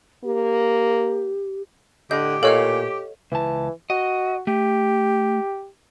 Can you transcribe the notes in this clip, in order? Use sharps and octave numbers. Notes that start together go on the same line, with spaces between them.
A#3 G4
A2 D3 G4 D#5 G6
A#2 A4 C#5 D#5 F5 F6
C#2 E3 A5
F#4 D#5
A3 G4